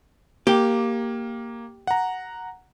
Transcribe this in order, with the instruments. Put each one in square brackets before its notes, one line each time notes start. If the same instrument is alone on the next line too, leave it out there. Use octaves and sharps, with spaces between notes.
[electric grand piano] A#3 [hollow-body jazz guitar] G4
[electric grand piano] F#5 A#5